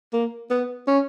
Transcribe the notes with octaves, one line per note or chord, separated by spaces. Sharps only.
A#3
B3
C#4